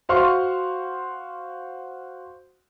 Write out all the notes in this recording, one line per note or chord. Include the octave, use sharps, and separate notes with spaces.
F#4 C5 F5 C6 C#6 F6